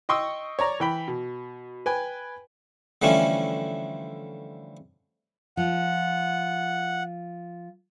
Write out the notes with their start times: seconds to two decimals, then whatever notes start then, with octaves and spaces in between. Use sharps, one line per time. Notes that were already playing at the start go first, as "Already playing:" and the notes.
0.09 D#5 G5 C6 C#6 D#6 E6
0.59 C#5 D5 A#5
0.80 E3 G5 B5
1.08 B2
1.86 B4 G5 G#5
3.02 D3 E3 F3 G3 A3 C#4
5.57 F3 F#5